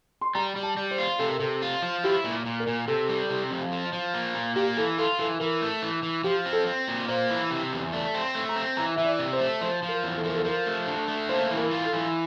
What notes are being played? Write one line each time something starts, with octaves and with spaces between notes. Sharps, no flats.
C6
G3 A#5
G3
A5
G3
C5
F4
C3 A4
A#4
C3 A4
F4
F3
E4 G4
A#2
A#2
A#4
A#2
C3 A4
G3
C3
F2
F3
F3
A#3
A#2
A#3 G4
E3 A4
F4 A4
E3 A4
E3 A#4
A3
E3
E3
F3 G4
C4
A4
C4
A#2
A#3 C5
E3
C3
E2
A3 D5
C4
C6
A3
A#5
C4
E3 A#5
E3 E5
D5
C3
C5
A3
F3 C5
F3
A#4
E2
A4
F3 A#4
A4
F3 A#4
A3
D3
A3
A#3 C5
E3
A#4
F4
A4
E3